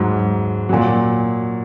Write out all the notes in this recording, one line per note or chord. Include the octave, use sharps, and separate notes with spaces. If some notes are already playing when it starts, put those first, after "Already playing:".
Already playing: G#2 F#3
A#2 F#3